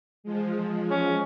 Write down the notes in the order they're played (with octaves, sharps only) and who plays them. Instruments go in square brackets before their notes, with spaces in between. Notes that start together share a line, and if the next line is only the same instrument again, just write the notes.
[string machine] F3 G#3
[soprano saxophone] C#4